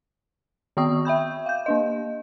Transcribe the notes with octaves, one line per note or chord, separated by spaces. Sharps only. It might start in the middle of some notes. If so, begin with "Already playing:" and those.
D#3 B3 F#4 G5 C#6 D#6
E5 G5 B5 G6
F5 G6
A#3 D4 D#5